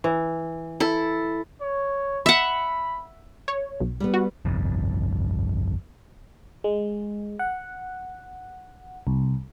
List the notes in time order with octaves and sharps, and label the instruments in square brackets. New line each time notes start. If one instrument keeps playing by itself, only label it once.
[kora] E3
[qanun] E4 A4
[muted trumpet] C#5
[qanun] E5 F#5 [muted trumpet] B5
[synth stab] C#5
B1
[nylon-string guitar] G3 B3
[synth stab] F#4
[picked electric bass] G1 C2 F2
[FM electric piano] G#3
F#5
C2